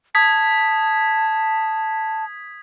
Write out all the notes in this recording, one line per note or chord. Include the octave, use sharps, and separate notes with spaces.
A5 D#6 G#6 B6